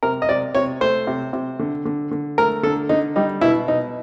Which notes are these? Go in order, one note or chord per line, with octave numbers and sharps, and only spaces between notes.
C3 A#4
D#5
C3 D5
C3 C#5
A3 C5
C3
C3
D3
D3
D3
A3 A#4
D3 A4
D3 D#4
G3 D#4
B2 E4
B2 D#4